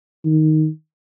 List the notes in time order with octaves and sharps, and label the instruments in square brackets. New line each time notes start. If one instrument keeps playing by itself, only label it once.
[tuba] D#3